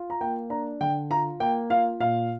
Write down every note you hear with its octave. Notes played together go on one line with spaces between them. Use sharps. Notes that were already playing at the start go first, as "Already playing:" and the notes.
Already playing: F4
A#5
A#3 G5
D4 A#5
D3 G5
F4 A#5
A#3 G5
F4 F5
A#2 F5